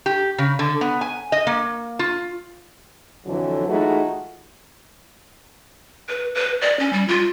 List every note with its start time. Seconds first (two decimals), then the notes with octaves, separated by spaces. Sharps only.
0.06 G4
0.38 C#3
0.59 D3
0.81 B3
1.01 G#5
1.32 D#5
1.47 A#3
1.99 F4
3.26 F2 D3 E3 F#3
3.68 E3 G#3 A3 D#4 F4 F#4
6.09 B4
6.35 B4
6.61 D5
6.79 C#4
6.93 G3
7.08 F4